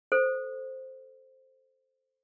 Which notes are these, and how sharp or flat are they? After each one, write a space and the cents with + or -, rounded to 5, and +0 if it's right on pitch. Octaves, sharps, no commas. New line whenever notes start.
A4 +0 C5 +0